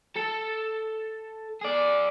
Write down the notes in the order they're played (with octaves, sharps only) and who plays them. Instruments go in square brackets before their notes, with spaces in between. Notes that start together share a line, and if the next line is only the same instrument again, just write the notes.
[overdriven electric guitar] A4 A5
G#4 D5